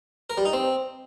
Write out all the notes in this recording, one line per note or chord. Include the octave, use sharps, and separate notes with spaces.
A#4
G3
D#4
C4